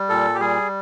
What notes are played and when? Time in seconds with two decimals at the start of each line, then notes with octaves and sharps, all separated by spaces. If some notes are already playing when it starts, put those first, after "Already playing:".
Already playing: G3
0.09 A#2 A4
0.35 G4
0.40 G3 G#4